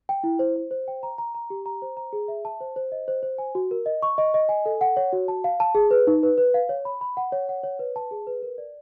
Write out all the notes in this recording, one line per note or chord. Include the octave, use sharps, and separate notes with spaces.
G5
E4
C5
C5
C5
G5
A#5
A#5
A#5
G4
A#5
C5
A#5
G#4
E5
A5
C5
C5
D#5
C5
C5
G#5
F#4
A#4
D#5
C#6
D#5
D#5
G#5
A4
F#5
C#5
F#4
A5
F5
A5
G#4
B4
D#4
B4
B4
F5
C#5
B5
B5
F#5
C#5
F#5
C#5
B4
A5
G#4
B4
A#4
D5